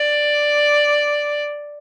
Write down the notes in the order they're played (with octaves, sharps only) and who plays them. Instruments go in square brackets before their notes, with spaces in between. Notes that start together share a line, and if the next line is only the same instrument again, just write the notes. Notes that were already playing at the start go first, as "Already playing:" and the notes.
Already playing: [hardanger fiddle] D5